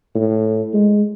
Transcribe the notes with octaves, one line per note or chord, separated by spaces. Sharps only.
A2
G#3